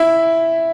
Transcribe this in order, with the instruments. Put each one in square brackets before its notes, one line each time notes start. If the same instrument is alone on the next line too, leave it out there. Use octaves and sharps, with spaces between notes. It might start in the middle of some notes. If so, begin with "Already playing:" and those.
Already playing: [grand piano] E4 E5